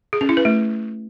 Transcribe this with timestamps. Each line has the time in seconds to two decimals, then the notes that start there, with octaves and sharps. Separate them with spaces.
0.13 G#4
0.21 C#4
0.29 E4
0.37 B4
0.45 A3